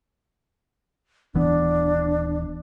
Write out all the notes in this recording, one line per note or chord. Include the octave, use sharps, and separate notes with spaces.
D#1 E3 B3 D4